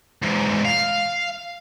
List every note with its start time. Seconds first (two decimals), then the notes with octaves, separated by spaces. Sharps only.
0.23 E2 G#2
0.65 F5